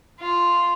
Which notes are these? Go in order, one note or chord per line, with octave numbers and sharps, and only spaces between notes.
F4